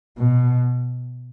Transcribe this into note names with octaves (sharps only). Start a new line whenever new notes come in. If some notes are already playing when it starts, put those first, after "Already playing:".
B2